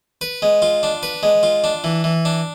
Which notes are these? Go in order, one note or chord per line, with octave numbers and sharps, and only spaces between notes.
B4
G#3
F4
D4
B4
G#3
F4
D4
E3
E3
D4